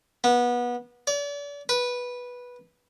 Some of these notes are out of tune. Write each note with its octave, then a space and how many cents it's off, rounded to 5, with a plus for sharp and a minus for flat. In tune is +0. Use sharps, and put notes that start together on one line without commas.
B3 -25
D5 -40
B4 -10